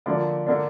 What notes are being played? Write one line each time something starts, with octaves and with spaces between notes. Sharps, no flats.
D3 F3 A#3 D5
D3 A#3 D4